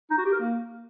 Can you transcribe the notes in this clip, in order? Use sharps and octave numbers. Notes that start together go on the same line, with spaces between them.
D#4
F#4
G4
A#4
A#3